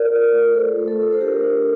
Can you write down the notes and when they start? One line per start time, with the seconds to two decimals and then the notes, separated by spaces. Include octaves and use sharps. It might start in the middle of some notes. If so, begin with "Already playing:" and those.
Already playing: A#4 D5
0.10 F4
0.32 A3
0.54 F4 A4 C5
0.76 A3
0.88 A4
0.99 F4
1.13 C5
1.21 D4 G4 A#4
1.43 D4